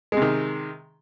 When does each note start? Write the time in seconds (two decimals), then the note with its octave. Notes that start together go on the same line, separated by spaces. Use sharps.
0.12 G#3
0.17 C3
0.22 D#3